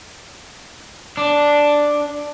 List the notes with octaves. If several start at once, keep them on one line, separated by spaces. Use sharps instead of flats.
D4